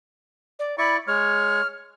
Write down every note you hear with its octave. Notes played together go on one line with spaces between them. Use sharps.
D5
E4 D5 B5 C#6
G#3 C#5 F6